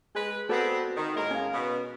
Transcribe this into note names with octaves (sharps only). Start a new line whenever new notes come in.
G#3 G#4 B4
B3 C4 F#4 A4 D5
D#3
A2 G#3 A#4 D#5 A#5
C#4 F5
B2